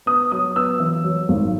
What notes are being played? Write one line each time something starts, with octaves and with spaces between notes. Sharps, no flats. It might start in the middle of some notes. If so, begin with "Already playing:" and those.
B3 D#6
F#3 D#6
B3 E6
E3
F#3
G#1